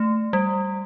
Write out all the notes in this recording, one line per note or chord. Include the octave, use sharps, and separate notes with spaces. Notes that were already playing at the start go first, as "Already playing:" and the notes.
Already playing: A3
G3